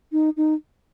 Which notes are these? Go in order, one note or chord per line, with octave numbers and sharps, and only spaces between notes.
D#4
D#4